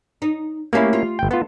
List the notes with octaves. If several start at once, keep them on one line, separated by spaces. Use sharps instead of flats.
D#4
A3 A#3 C#4 E4 G4 F5
F4
G1 G5
B3 F4 A4